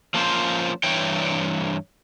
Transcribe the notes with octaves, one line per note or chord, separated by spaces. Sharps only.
F3 A#3 C#4 F4 C5
G2 E3 C#5 G5